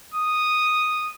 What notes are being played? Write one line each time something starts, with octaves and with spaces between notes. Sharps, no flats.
D#6